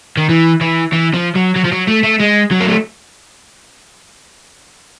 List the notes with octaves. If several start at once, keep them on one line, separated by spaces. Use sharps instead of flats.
D#3
E3
E3
E3
F3
F#3
F#3
F3
F#3
A3
A3
G#3
F#3
A#3
A3